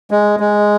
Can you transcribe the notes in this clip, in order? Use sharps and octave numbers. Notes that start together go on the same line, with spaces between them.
G#3
G#3